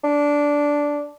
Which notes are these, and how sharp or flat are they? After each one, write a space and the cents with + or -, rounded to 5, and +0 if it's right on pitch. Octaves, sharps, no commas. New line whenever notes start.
D4 -10